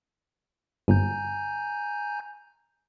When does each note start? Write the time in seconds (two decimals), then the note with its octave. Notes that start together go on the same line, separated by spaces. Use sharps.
0.88 G1 G#5 A#5 G6